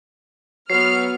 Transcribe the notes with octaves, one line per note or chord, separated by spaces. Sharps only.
F#3 B3 F6 C7